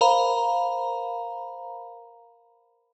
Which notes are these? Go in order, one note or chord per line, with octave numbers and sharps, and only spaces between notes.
A#4 C5 F5 A#5 B5